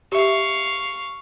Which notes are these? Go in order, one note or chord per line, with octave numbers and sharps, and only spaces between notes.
G4 E5 F5 C#6